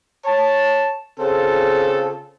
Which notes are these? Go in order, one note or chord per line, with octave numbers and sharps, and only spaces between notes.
C#5 A5
C#3 C4 F4 A4